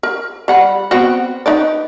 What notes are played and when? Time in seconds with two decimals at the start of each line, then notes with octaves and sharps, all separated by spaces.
0.03 A#4
0.48 G3 F#5 B5
0.91 B3 C4 F#4
1.46 D#4 B4 D5